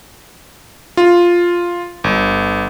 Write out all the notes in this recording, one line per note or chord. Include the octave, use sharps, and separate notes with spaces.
F4
G1